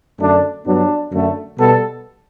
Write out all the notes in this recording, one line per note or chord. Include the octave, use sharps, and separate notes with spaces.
F#2 D3 A3 D4
G2 F#3 B3 D4
F#2 D3 A3
B2 G3 B3 A4